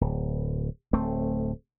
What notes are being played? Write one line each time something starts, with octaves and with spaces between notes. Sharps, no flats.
D1
D1 A3 C4